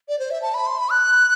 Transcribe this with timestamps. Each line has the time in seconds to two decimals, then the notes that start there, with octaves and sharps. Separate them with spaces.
0.09 D5
0.19 C5
0.31 E5
0.42 A5
0.54 B5
0.67 C6
0.78 B5
0.91 F#6